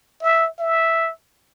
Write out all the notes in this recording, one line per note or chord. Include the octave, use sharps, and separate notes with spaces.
E5
E5